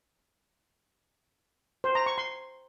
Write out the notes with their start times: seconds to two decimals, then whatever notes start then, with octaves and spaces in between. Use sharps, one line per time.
1.84 C5
1.95 A#5
2.06 C#6
2.18 C6